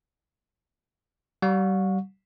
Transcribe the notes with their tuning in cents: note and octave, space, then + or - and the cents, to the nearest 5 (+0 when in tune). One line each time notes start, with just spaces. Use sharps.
G3 -35 F#5 -45 C#6 +0